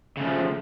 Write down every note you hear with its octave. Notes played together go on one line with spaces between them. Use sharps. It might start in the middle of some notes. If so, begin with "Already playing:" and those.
C#3 F3 A3